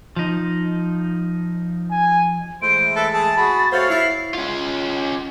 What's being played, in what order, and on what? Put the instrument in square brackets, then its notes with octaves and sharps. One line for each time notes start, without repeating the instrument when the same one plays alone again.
[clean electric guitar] F3 D#4
[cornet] G#5
[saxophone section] E3 G#3 A3 [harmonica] C5 [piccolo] D7
[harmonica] A4 B4 E5 [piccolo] A6
[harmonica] G#4 A5
F#4 G#4 B5
[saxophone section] A3 F#4 C5 [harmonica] C#5 F5
[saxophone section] E4 [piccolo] C7
[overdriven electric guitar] C#4 F4